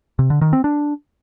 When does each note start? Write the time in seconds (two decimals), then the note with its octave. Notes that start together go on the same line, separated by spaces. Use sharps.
0.19 C3
0.30 D3
0.41 D#3
0.53 C4
0.64 D4